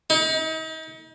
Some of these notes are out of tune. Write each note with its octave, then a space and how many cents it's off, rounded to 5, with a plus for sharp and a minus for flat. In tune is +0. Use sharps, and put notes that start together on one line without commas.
D#4 +40